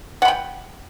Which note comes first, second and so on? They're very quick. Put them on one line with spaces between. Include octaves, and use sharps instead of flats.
F#5 B5 G5